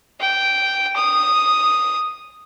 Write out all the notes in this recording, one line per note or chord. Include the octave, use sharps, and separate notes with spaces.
G5
D#6